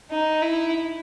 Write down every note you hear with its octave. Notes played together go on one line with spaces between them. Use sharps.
D#4
E4